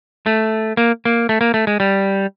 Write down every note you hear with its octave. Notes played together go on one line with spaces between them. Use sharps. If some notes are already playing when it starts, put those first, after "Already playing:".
A3
A#3
A#3
A3
A#3
A3
G#3
G3